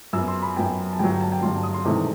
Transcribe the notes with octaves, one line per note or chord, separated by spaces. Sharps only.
F#2 F#3 B3 E6
C6
B5
F#2 F#3 B3 G5
A5
G1 G2 F#3 G5
G5
A5
G5
G1 G2 F#3 C6
D#6
C6
E1 E2 C3 D#3 A3